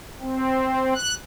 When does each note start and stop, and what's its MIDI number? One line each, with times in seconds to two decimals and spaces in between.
0.21 0.94 60
0.95 1.14 90